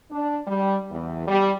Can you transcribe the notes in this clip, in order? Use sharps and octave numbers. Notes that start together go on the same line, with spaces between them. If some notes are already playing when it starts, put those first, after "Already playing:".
D4
G3
E2
G3